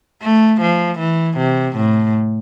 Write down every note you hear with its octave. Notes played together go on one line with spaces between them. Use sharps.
A3
F3
E3
C3
A2